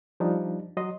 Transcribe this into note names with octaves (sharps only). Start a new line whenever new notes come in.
F3 G3 D4 D#4
F#3 D#5 C6